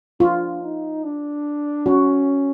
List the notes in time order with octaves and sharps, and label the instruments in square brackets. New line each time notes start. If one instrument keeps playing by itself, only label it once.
[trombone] D4 [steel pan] F4
[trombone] D#4
D4
[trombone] C#4 [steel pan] F#4